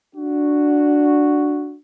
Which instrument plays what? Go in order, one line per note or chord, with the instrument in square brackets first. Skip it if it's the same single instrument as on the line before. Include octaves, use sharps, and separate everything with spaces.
[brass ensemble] D4 F#4